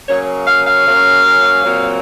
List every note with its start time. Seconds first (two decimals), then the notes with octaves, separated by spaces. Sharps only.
0.08 C#3 F#3 A#3 C#4 C#5
0.47 F5
0.66 F5
0.85 C#3 F#3 A#3 C#4
1.62 A#2 F#3 C4